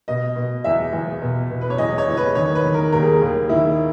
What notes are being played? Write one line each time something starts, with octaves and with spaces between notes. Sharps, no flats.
B2 D#5
B2
E2 E5
E2
B2
B2
B4
C#5
E2 D#5
C#5
E2
B4
D#3 C#5
B4
D#3
A#4
D#2 A#4
G#4
A#4
D#2
D#3 E4